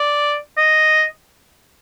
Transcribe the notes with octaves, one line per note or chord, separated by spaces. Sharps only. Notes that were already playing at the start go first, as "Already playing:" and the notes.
Already playing: D5
D#5